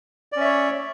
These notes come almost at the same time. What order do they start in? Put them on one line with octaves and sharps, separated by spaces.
D5 C#4 E5 C#5